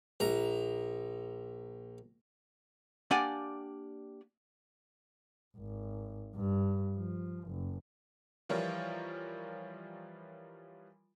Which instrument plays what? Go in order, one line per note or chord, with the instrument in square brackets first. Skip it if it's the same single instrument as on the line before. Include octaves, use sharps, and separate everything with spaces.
[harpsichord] A#1 A#5
[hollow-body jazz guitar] A#3 D4 G4 D5 F#5 G#5
[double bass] G#1
G2
F3
F#1
[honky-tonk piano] E3 F3 G3 F4 A#4 C#5